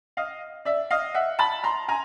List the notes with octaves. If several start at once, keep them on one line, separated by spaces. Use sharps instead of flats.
D#5 F5
D5 E5
D#5 F5
E5 F#5
A5 B5
A#5 C6
G#5 A#5